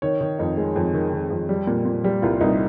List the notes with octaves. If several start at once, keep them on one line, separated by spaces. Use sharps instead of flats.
D#3 C#5
D#3
F2 D#4
G#3
F2
D#3
D#3
F2
G3
A#2
A#2
G3
C2 F4
C2 D#4